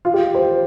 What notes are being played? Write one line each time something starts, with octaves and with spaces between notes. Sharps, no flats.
F4
G4
C5